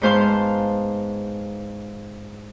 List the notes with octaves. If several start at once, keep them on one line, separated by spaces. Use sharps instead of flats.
G#2 B3 C5 F5 A5 C6